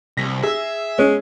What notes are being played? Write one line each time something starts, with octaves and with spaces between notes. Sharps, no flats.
C2 A#6 B6
G#4 E5 E6
G#3 C#4